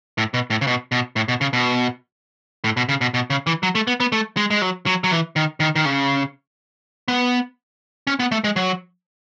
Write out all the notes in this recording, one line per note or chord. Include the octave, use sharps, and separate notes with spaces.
A2
B2
A2
C#3
B2
B2
A2
B2
C#3
B2
A2
B2
C#3
B2
B2
C#3
E3
F#3
A3
B3
B3
A3
G#3
G#3
F#3
F#3
F#3
E3
D#3
D#3
D#3
C#3
B3
C#4
B3
A3
G#3
F#3